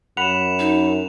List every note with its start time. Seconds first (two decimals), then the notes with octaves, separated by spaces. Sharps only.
0.17 F#2 F#5 B5 E7 F7
0.59 D#4